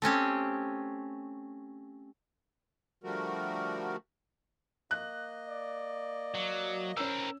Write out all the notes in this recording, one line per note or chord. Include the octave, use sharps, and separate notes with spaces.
A3 C4 C#4 G4
D3 F3 G3 A3 F#4 A#4
A#3 D#5 F#6
D5
F#3
C4 C#4 A#4 E6